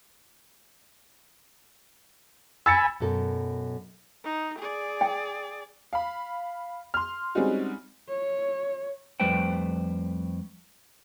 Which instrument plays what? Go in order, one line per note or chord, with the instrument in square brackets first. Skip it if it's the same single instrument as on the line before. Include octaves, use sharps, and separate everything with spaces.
[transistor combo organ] G#5 B5 [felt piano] E6 A6 C#7
[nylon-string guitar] F#2 B2 A4 A#4
[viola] D#4
G#4 D5
[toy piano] G5
[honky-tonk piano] F5 B5
C6 F6
G3 G#3 C4 C#4 D#4 F#4
[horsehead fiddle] C#5
[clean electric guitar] F2 G3 A3 B4 C5 G5